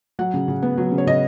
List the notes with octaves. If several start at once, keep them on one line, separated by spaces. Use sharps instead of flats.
F#3 F#5
C#3
C#3
B3
F#3
C#3
C#5
C#3 D#5